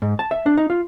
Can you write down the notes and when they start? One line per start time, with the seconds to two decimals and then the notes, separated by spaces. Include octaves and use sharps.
0.02 G#2
0.19 A5
0.31 E5
0.46 D4
0.57 D#4
0.70 F4